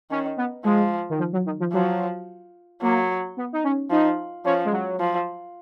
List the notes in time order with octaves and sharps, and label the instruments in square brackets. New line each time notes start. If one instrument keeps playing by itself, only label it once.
[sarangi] D#3 [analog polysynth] C#4
[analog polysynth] B3
[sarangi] F3 [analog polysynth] G#3
[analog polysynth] D#3
F3
F#3
D#3
F3
[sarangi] F3 [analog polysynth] F#3
[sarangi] F#3 [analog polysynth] A#3
[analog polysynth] B3
D#4
C#4
[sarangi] F3 [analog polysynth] D#4
[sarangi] F3 [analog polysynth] C#4
[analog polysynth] G#3
F#3
[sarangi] F3